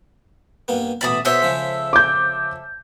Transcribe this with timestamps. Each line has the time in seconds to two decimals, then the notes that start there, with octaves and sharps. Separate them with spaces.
0.68 G2 A#3 B3
1.01 A1 B2 D5 E5 B5 D#6
1.25 B2 A4 C5 C#5 E5 D#6
1.42 C#3 F3 G#3
1.93 D6 G6